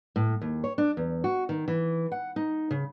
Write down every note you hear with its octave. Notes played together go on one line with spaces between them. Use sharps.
A2
D#2
C#5
D4
E2
F#4
D#3
E3
F#5
D#4
C#3